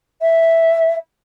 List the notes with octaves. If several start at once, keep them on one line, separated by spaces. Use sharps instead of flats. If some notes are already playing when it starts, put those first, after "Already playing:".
E5